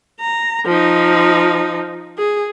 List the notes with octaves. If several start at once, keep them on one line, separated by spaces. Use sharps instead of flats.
A#5
F3 D#4
G#4